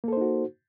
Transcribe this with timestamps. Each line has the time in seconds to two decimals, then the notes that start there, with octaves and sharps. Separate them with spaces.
0.04 A#3
0.08 A4
0.13 C5
0.17 D#4
0.21 F#4